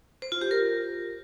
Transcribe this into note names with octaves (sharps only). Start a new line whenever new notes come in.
C5
F4
G4
A#4